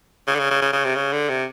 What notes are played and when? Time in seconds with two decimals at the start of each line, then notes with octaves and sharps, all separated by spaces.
0.28 C#3
0.35 D3
0.39 C#3
0.51 C#3
0.61 C#3
0.73 C#3
0.84 C3
0.95 C#3
1.13 D3
1.29 C3